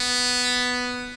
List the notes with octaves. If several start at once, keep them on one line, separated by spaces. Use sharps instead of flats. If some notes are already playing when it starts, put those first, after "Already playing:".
Already playing: B3